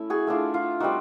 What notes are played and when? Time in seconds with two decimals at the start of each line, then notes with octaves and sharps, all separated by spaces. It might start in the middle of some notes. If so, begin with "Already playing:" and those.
Already playing: A3 C#4 E4
0.10 F#4 G#4
0.27 A3 D4 F4 F#4
0.54 F4
0.80 G3 C4 D#4 F#4